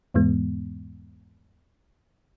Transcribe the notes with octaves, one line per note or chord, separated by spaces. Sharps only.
E2 G#2 E3 G#3 B3